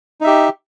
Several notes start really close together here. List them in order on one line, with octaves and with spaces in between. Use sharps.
D#4 E5 G4